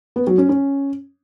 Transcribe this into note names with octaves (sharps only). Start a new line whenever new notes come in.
B3
F#3
C#4
C#4